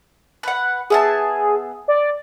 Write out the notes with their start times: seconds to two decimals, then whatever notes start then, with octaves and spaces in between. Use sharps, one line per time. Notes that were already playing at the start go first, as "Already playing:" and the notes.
0.43 B4 F#5
0.90 B3 G#4 E5 A5
1.88 D5